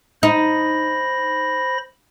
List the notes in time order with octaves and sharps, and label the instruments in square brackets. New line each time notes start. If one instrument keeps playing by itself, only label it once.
[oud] D#4 [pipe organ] C5 B5 A#6